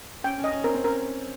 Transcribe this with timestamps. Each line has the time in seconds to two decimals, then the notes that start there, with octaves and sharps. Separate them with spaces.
0.24 C#4 G5
0.38 C#4
0.44 D#5
0.51 C#4
0.64 C4 A#4
0.74 C4
0.84 C#4 A#4